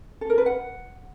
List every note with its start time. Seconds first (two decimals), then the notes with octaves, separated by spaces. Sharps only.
0.21 A4
0.30 A#4
0.38 B4
0.46 F#5